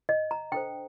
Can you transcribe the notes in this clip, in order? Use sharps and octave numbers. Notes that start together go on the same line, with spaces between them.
D#5
A#5
D4 A4 C5 G5